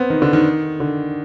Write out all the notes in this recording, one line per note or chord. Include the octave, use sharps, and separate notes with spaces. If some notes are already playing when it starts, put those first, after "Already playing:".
Already playing: B3 C4
D#3
D3
D#3
D3